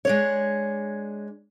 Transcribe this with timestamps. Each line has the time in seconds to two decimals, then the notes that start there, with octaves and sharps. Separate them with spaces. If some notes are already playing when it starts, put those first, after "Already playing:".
0.05 G#3 D4 C#5